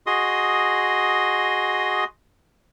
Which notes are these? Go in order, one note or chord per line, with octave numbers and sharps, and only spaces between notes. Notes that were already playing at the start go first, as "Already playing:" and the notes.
F#4 G#4 D#5 C6 D#6